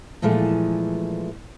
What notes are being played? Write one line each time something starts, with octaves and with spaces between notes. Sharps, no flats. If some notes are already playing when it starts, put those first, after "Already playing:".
A#2 E3 F3 G#3 A3